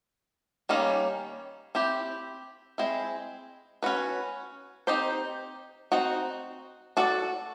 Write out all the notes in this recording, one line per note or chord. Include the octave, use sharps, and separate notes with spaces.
D#3 G3 A#3 C#4
C4 E4 G4
G#3 C4 E4
C#4 F#4 B4
C4 D#4 G4 C5
C4 D#4 F#4
D4 F#4 A4 D5